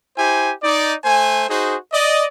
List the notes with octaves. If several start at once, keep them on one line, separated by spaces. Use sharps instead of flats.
E4 G4 C5 G#5
D#4 D5
A3 C5 G#5
D#4 F#4 G#4 C5
D5 D#5